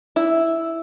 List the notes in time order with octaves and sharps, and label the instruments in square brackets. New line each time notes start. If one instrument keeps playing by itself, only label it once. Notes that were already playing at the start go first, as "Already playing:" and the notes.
[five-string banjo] E4